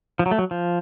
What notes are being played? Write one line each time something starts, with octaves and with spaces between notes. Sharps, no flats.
F3
F#3
A3
F#3
F3